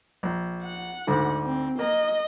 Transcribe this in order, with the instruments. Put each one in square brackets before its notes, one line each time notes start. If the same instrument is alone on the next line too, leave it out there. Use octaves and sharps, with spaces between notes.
[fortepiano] A#1
[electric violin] F#5
[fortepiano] D2 G#2 D3
[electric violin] C4
[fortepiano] A#3 [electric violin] D#5